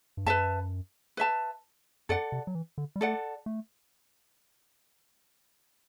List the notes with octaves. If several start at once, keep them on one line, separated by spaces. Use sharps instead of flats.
G2
F#2 B4 E5 A5
B4 E5 A5
F#2 A4 D5 F#5
C3
F#3
E3
D3
G3
A3 A4 D5 F#5
A3